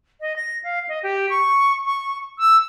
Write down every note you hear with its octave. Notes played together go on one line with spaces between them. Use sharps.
D#5
A#6
F5
D#5
G4
C#6
C#6
E6